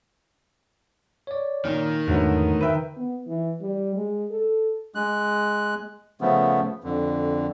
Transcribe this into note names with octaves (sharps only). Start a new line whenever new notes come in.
C#5 D5
A#2 D#3
E2 G#2 D3 F#3 A3 B3
B4 E5 G5
B3
E3
G3
G#3
A4
G#3 F#6
C#3 F3 A3 B3
F2 D3